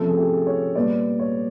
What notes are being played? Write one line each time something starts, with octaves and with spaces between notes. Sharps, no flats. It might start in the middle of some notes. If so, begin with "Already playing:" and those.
Already playing: C3 F3 A3 C#4 A4
G#4
G4
C#5
A#2 G3 B3 D5
C#5